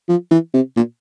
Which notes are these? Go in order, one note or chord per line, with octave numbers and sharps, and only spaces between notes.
F3
E3
C3
A#2